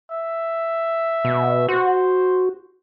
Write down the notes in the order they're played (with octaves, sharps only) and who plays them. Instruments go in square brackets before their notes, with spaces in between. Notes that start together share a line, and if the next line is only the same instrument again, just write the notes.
[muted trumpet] E5
[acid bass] B2
[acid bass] F#4 [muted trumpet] C5